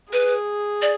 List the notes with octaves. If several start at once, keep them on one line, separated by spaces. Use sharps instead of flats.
G#4 B4
D5